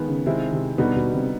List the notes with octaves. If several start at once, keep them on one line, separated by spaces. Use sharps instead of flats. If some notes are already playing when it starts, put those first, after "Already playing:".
Already playing: D#3 G#3 B3
C#3
C3 D#3 G#3 C4 E4
C3
B2 D3 G3 B3 D#4 F#4
B2
C3